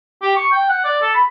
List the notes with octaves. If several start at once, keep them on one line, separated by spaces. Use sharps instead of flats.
G4
C#6
G5
F#5
D5
A4
B5